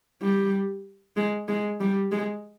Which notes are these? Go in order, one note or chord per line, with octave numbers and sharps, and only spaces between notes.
G3
G#3
G#3
G3
G#3